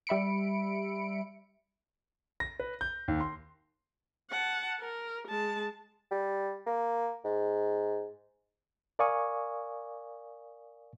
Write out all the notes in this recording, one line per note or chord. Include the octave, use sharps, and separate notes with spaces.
G3 E5 B5 C#7 D7
A#6
B4
G6
D#2
C6
F#5 A5
A#4
G#3 A5
G3
A#3
G#2
A#4 D5 F5 G#5 C#6 D#6